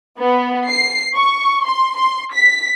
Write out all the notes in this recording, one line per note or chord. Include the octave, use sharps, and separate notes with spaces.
B3
C7
C#6
C6
C6
B6